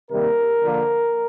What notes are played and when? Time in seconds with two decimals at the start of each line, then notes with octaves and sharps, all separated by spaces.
0.09 C3 D#3 G3 A#3 A#4
0.61 D3 F3 A#3